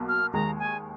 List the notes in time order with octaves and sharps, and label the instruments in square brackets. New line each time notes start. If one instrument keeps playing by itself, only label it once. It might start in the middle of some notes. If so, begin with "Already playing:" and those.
Already playing: [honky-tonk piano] B1 B2 A#3
[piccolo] F6
[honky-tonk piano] D#2 D#3 G#3 [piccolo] A#5
[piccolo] G#5